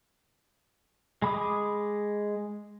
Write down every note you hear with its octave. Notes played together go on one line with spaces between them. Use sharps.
G#3 B5 D6 D#6